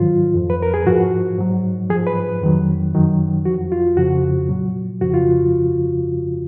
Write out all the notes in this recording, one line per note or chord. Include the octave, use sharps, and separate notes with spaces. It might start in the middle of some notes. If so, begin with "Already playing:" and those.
Already playing: G#2 D#3 F#3 F4
F2 F3
B4
A#4
G#4
G#2 F3 F#4
G#2 F#3
G#2 F3 G#4
B4
F2 D#3 F#3
F#2 D#3 F#3
F2 F3 F#4
F4
F2 C#3 F3 F#4
A#2 F#3
F2 C#3 F3 F#4
F4